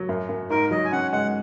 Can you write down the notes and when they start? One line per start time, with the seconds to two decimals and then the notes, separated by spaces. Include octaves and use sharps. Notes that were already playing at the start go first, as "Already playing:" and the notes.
Already playing: F#3
0.09 F#2
0.29 F#2
0.50 G#2 A#4
0.71 F#3 D#5
0.85 G#5
0.92 C#4 F#5
1.13 G#3 F#5